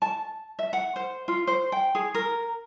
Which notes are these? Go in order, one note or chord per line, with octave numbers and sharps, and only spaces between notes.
A5
E5
F#5
C5
F4
C5
G5
G#4
A#4